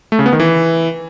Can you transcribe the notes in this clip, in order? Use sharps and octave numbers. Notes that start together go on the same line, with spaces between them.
A3
C#3
B3
D#3
E3